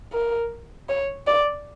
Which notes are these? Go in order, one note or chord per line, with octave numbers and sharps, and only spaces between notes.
A#4
C#5
D5